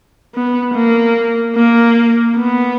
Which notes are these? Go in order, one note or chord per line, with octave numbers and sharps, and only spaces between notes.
B3
A#3
A#3
B3